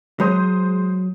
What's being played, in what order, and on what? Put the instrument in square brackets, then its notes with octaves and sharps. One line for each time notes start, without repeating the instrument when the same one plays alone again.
[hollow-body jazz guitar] F#3 [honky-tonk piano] G#3 C5 D#6